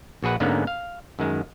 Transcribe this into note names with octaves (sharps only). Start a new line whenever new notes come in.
A#1 F#4 G#4 B4 F#5
G#2 D3 G#3 A#3 B3 C#4
F5
F#2 D#3 G#3